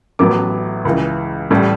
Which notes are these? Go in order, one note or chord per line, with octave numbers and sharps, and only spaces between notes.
A1 A2 F#3 B3 D6
C#2 C#3 E3
A1 A2 G3